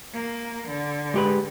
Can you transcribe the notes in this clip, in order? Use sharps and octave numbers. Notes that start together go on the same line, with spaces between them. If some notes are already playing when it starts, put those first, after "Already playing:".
A#3
D3
G#3 G4 B4